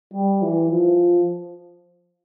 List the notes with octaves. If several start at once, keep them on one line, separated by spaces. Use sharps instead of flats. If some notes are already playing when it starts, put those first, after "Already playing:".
G3
E3
F3